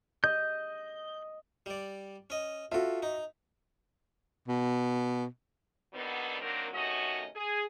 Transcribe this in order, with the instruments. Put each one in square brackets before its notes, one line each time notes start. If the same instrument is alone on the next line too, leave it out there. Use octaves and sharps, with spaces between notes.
[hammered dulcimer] D#5 [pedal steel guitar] G6
[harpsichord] G3 D5
C#4 D#5
[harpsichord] F4 A4 [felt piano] F#4 E5
[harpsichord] D#4
[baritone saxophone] B2
[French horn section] A#2 D3 D#3 G3 B3
D#3 F#3 A#3 C4 D4 A#4
C3 D#3 A3 C#4 F#4 D#5
G#4